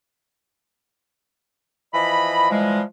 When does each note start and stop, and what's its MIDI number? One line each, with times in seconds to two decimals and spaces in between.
1.94 2.48 52
1.94 2.48 53
1.94 2.48 75
1.94 2.48 83
2.50 2.81 52
2.50 2.81 53
2.50 2.81 55
2.50 2.81 56